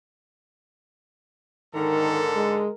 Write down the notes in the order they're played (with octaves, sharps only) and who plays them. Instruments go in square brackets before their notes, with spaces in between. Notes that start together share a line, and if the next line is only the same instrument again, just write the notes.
[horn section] G#2 D3 A4 [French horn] D#3 [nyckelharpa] A#4
[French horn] G#3